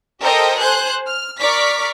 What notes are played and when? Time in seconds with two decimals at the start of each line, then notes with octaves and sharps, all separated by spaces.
0.21 G4 A4 A#4 C5 D#5 G5
0.59 C5 G#5 F#6 G6
1.07 F6
1.39 A#4 D5 C#6 D6 F6 B6